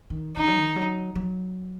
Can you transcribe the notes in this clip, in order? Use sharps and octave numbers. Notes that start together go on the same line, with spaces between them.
D#3
D#3 D#4
F#3
D#3
F#3
F#3